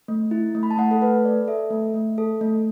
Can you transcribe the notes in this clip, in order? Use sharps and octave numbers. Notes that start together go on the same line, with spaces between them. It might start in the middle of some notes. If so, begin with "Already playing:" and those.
A3
E4
A3
B5
A5
A3 F#5
A4
A3 B4
A4 D5
A4 E5
A3
A3
A4
A3